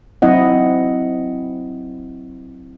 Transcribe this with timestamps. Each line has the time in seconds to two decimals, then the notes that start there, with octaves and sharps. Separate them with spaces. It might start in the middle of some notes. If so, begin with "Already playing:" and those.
0.22 F#3 C4 E4 D#5 F#5